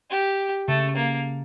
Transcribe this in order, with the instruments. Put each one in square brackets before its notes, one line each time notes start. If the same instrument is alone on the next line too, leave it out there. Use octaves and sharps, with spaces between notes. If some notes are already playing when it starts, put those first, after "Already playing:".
[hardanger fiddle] G4
[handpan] C#3 [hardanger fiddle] A3
[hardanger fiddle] A#3